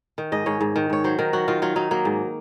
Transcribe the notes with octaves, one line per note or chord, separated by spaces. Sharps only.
D#3
G#2 D#5
G#2 C#5
G#2
D#3
G#2 C#5
F#3 C5
D#3 A#4
F#3 F#4
D#3 F4
F#3 F4
F#3 D#4
F#3 A#3
G#2